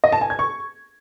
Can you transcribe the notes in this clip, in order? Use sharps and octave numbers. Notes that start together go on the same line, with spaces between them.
D#5
A5
G#5
G#6
C#6